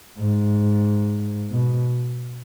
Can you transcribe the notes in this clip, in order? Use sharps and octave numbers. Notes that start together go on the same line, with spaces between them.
G#2
B2